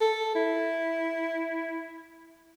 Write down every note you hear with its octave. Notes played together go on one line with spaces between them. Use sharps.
A4
E4